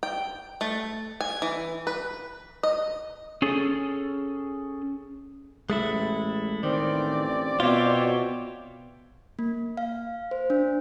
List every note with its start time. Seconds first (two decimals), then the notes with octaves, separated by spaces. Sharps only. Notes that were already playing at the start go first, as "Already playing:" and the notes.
0.03 G5
0.61 A3
1.21 G#5
1.42 E3
1.87 B4
2.63 D#5
3.42 C#4 G#4 A4
5.70 A1 G#3 A3 E4
6.63 A1 D#3 C4 D5
7.60 B2 C4 F4 C#5 E5 G5
9.39 A#3
9.77 F5
10.31 C5
10.50 D4